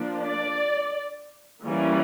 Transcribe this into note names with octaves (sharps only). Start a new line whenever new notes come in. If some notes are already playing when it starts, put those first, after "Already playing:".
Already playing: F3 A#3 D4
D5
E3 G3 A#3 C#4